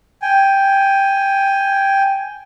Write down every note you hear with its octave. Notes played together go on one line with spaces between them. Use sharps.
G5 G#5